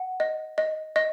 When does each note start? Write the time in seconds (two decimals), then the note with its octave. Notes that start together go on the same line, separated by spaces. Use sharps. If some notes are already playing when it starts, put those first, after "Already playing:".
Already playing: F#5
0.20 D#5
0.58 D#5
0.96 D#5